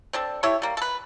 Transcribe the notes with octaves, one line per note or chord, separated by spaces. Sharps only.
C4 D4 A4
E4 G4 A4 C#5
G3 A#3
A4 B4